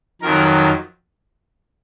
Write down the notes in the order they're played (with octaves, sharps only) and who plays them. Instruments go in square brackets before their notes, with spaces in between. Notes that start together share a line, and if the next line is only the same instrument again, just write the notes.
[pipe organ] F2 D#3 F#3 A#4